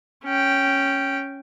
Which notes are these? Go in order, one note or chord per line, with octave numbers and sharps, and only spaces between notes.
C#4 G5